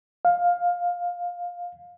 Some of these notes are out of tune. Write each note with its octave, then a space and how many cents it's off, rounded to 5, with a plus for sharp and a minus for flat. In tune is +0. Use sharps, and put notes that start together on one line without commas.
F5 +15